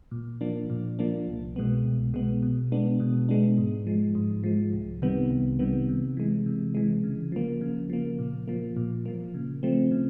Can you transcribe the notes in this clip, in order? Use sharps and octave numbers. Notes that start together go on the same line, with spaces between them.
A#2
F3 A#3 D4
A#2
F3 A#3 D4
C2
B2 G#3 B3
C2
B2 G#3 B3
B2
G#3 B3 D4
B2
G#3 B3 D4
G#2
F3 G#3
G#2
F3 G#3
C2
C3 D#3 G3 B3
C2
C3 D#3 G3 B3
C3
E3 G#3
C3
E3 G#3
C#3
F3 A#3
C#3
F3 A#3
A#2
F3 A#3
A#2
F3 A#3
C#3
F3 A3 C4
C#3